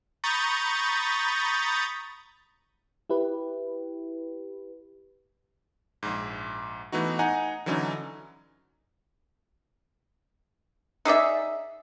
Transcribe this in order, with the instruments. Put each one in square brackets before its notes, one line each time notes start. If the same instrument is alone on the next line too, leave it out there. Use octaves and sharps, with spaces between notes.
[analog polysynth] A#5 B5 C#6 D#6 G6 A6
[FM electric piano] E4 G4 B4
[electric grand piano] A#1 G#2
E3 A3 B3 D#4 F#4
D#4 F#5 G#5 A#5
D3 E3 F#3 C#4 D#4
[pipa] D#4 G#4 D5 E5